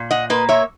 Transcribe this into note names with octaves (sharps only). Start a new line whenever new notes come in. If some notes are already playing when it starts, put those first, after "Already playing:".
Already playing: A#2
D#5 F#5
A#3 B4 D#5
C#5 E5